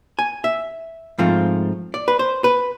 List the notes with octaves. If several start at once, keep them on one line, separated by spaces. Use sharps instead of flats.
G#5
E5
G#2 F3 A3 C4 F4
D5
B4
C5
B4